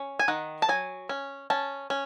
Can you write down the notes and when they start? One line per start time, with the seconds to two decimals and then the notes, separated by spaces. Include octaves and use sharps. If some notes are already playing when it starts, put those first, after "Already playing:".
Already playing: C#4
0.19 G#5
0.28 D#3 F#5
0.62 A5
0.69 F#3 G#5
1.09 C#4
1.50 C#4 A5
1.90 C#4